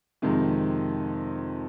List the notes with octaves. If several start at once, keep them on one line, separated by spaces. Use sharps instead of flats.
F2 C3 D#3 G#3